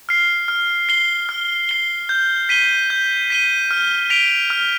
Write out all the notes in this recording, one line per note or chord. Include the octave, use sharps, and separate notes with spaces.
F6 C7
F6
C7 G7
F6
C7 G7
G6
B6 D#7 G7
G6
B6 D#7 G7
F6
B6 D7 F7
F6